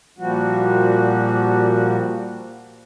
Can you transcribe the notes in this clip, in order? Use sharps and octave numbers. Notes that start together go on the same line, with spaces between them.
A#2 F3 G3 F#4